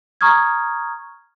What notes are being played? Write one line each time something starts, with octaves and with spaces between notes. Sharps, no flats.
A#5 C#6 D#6 F6 G#6